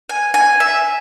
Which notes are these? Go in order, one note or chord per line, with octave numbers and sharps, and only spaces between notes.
G#5
G#5
E5